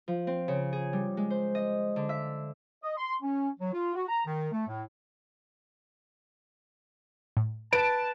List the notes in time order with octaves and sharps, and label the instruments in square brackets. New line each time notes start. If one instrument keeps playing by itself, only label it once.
[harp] F3
C4
C#3
G#4
G3
G#3
C5
D#5
D3
E5
[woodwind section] D#5
C6
C#4
F#3
F4
F#4
A#5
D#3
A3
A2
[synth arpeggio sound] A2
[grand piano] B4 [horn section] A5 [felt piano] D7